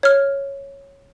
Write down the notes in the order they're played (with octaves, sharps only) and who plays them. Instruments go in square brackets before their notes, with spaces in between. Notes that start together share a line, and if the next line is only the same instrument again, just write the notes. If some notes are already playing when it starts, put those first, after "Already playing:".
[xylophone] C#5 F6